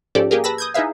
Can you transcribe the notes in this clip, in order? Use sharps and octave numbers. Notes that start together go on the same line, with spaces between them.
G#2 F3 C#4 G4 A4 D5
A#3 G4 G#4 A#4
B4 A5 B5 E6 A#6
D#6 G6 G#6
D#4 E4 G#4 B4 E5 F5